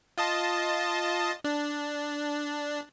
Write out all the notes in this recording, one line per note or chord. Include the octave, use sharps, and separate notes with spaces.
F4 D#5 A5
D4